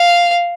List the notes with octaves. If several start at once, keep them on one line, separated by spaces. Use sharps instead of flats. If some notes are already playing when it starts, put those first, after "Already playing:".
Already playing: F5